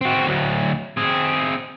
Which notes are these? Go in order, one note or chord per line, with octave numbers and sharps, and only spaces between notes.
C4 F#4
D2 F#3
C4 G#4